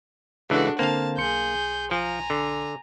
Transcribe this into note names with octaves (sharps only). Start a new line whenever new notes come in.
C#2 E3 D4 F#4 G#4 A4
D3 A#3 C4 C5 F5 A5
B1 G#4 C6 G6 C#7
F3 G#5 A#5
D3